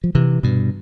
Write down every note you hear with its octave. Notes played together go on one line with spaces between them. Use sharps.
F3
C3 E3
G2 B2